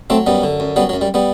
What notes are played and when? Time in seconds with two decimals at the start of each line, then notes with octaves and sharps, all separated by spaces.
0.10 F#3 A3 C4
0.27 F#2 G3 B3
0.43 D3
0.60 F#2
0.76 F#3 G3 B3
0.89 F#3
0.94 F#2
1.01 G3
1.14 G3 B3